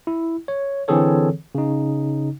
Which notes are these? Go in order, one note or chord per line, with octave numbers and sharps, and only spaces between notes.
E4
C#5
D3 E3 C4 G#4 A4 C#5
C#3 D#4